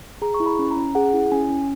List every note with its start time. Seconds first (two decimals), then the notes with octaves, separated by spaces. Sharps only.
0.22 G#4 A#5
0.34 C#6
0.40 E4
0.46 B5
0.59 C#4
0.71 A#5
0.77 C#4
0.95 G#4 F#5
1.13 E4
1.32 C#4 G#5
1.50 C#4